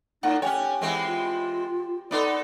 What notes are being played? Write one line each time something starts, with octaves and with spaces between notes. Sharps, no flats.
A2 D#4 D5 F#5 A#5
C#4 G4 C#5 F#5 G#5
E3 G#3 C4
F4
B3 D#4 A4 D5 C6 D6 D#6